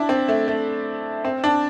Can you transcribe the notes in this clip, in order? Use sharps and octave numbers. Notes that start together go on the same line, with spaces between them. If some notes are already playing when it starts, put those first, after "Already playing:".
Already playing: D4 E4
C4
A3
A3
C4
D4